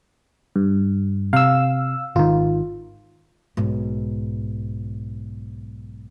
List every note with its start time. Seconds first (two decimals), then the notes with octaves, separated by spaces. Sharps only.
0.56 G2
1.33 C3 F5 E6
2.16 G#1 D#3 F4
3.57 B1 G#2